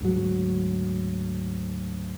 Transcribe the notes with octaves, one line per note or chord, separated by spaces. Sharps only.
D2 G#2 F#3